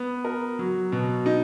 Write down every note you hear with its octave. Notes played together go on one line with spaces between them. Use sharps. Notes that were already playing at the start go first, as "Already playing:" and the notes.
Already playing: B3
A#4
F#3
B2
D#4